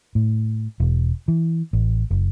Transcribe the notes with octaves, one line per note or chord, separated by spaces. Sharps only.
A2
E1
E3
A1
F#1